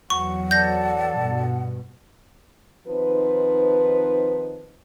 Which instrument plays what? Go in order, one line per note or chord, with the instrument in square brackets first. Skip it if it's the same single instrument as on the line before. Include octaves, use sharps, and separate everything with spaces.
[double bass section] E2 F#3 [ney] F#5 [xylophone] C#6
[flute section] A4 D5 A5 [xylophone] G6 A#6
[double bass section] G2 B2
[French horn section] D#3 F3 C4 D#4 B4